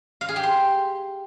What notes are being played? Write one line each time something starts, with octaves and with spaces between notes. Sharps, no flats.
F5
G#4
G4
C6